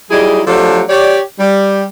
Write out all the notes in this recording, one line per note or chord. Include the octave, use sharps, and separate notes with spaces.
F#3 G3 D#4 E4 G#4
F3 F#3 A3 D4 G4 A4
G4 C#5 D5
G3